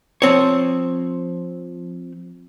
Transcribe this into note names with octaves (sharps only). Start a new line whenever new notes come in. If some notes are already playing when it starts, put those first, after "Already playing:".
F3 C4 C#5